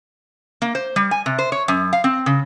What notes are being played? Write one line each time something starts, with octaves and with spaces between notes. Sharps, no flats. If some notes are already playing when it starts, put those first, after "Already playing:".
A#3
C5
G3
G#5
C3
C5
C#5
F#2
F5
C4
C#3